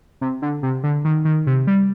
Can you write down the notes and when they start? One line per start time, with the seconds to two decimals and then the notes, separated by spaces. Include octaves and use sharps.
0.21 C3
0.42 D3
0.63 C3
0.83 D3
1.05 D#3
1.25 D#3
1.47 C3
1.67 G3